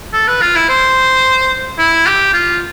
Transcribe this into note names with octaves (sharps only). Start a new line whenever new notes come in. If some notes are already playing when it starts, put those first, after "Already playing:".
A4
B4
F4
E4
C5
E4
G4
F4